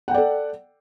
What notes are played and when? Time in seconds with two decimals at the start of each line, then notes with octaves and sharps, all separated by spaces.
0.08 F#5
0.11 G5
0.14 D5
0.18 A4